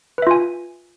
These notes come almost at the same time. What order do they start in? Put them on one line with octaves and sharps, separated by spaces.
B4 E5 F4 G#5